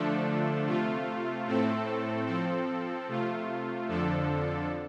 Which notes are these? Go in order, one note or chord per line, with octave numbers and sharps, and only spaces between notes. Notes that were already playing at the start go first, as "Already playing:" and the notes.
Already playing: D3 F3 A3 D4 A4
C3 A3 F4
A2 A3 C4 A4
F3 C4 A4
C3 A3 F4
F2 D3 F3 D4 A4